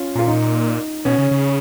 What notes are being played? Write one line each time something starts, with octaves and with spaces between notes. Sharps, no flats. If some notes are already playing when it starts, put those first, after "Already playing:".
Already playing: C#4 F4
A#2 F4
D#4
B2 C#4
C#3
C#3